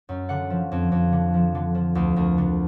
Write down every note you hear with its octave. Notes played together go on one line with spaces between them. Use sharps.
F#2
D3 F#5
F3
F2
F2
D3
F3
D3
F3
D2
D2 A#4
D3